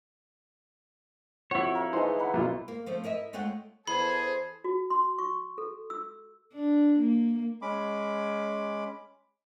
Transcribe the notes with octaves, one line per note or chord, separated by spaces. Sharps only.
F2 E4 F#4 C#5
A#4 F5
E3 G#3 A3 D#4 C5
A#4 B4 F#5
B1 F#2 F4
A#3
F3 A3 C4 C#4
E4 A#4 D#5 E5
G#3 A3 F4 C#5 F#5 G5
E2 G#4 A4 C5 B5
F#4
C6
C#6
A4
E6
D4
A#3
G#3 C#4 B5 D6